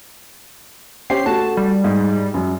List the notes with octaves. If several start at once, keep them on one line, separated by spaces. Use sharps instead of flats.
C#4 G4 C5 C7
A3 F#4 A5
G3
G#2
F#2 F#3